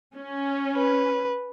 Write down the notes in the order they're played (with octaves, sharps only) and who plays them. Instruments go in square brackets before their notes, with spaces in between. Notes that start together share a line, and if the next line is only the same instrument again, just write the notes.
[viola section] C#4
[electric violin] B4